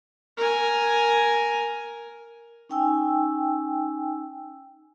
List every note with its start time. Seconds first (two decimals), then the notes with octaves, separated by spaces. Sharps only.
0.37 A#4 G#5
2.69 C#4 D#4 G5 G#5 E6